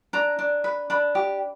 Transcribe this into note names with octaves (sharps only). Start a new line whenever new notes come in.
D4 A#5
D4
B4
D4 B5
G4